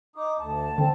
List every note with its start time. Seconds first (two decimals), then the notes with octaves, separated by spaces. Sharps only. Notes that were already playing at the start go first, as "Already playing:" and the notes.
0.16 D#4 D6 D#6
0.39 D2 A5
0.78 D3 C4